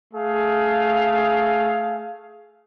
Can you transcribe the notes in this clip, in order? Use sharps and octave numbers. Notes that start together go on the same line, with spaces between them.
A3 G#4 F5